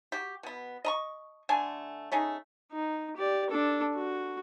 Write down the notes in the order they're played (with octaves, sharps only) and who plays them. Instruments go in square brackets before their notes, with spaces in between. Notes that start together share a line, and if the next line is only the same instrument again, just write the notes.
[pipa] F#4 G4
B2 B3
D#5 A#5 C#6
D3 A3 G#5 A5
A3 C#4 D#4 G#4
[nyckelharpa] D#4
G4 D5
D4 A4
F#4